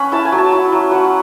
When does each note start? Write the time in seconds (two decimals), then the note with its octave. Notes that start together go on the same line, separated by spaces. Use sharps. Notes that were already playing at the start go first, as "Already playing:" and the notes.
Already playing: C#4 F#5 B5
0.12 E4 A5
0.25 G#5
0.32 F#3
0.38 A5
0.52 E4
0.72 F#3
0.91 F#3 F#5